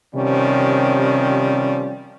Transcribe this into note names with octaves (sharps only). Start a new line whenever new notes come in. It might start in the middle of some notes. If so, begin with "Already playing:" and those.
C3 D#3 F3 G3 C#4